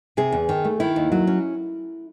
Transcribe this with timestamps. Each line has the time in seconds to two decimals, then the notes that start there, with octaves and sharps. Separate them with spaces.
0.17 C3 G#4
0.32 E2
0.49 D#3
0.65 A3
0.80 D#3 E4
0.96 D#2
1.12 F#3
1.27 C#4